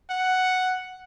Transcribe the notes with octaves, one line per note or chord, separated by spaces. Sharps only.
F#5